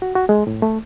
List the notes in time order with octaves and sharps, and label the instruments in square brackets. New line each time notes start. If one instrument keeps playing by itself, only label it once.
[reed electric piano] F#4
F#4
G#3
A2
A3